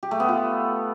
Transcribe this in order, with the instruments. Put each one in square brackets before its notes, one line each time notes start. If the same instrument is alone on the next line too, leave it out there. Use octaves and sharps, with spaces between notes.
[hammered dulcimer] G4
A3
B3
F4